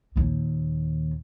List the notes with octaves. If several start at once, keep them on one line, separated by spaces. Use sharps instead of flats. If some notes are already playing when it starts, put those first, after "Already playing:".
D#2 A#2